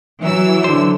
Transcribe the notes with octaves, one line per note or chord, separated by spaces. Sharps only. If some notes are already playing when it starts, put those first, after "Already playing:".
E3 F#3 E6
D3 C5